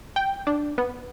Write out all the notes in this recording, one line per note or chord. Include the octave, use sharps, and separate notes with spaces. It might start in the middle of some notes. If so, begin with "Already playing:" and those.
G5
D4
B3